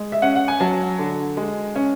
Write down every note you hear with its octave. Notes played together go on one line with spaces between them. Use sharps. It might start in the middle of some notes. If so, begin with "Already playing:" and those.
Already playing: G#3
E5
C#4 F#5
F#5
G#5
F#3 A5
D3
G#3
C#4